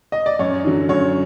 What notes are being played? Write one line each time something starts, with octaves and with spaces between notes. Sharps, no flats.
D#5
D5
F#2 C#5
D3 F#3
F#2 C#5